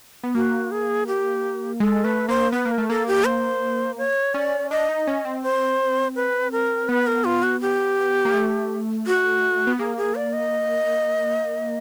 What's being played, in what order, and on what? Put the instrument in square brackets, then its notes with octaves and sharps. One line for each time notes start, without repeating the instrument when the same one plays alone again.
[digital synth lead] B3
[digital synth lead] A#3 [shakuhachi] F#4
[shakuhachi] G#4
G4
[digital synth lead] G#3 [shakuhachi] A4
[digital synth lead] A3 [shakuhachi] B4
[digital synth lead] A#3 [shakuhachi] C5
[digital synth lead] B3 [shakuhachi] B4
[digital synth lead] A#3
[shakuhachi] A#4
[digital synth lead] A3
[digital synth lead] A#3 [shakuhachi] A4
[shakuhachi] G4
C5
C#5
[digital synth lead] C#4 [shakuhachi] D5
[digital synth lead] D4 [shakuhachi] D#5
[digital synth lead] D#4
C#4
C4
[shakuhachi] C5
B4
A#4
[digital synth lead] B3 [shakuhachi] B4
[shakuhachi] A#4
F4
F#4
G4
[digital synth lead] A#3
A3
[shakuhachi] F#4
[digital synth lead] B3
[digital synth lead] A#3 [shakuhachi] G#4
[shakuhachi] G#4
D5
D#5